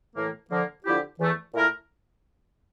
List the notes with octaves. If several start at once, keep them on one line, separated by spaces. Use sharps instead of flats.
A2 E3 A#3
D3 F3 A#3
D3 F3 C4 E4 G4
E2 E3 A3
A#2 A3 E4 A#4